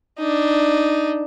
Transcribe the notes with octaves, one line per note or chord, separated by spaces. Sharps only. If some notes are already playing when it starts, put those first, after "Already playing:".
D4 D#4